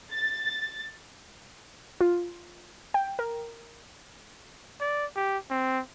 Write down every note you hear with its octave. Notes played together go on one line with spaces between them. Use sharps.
A6
F4
G5
A#4
D5
G4
C4